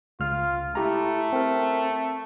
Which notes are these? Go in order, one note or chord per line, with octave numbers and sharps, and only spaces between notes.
C#2 F4 F6
A3 E4 G4 A#5
C4 A#4